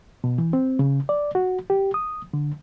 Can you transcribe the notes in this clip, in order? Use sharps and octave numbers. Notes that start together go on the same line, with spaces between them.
B2
E3
C4
C#3
D5
F#4
G4
D#6
D3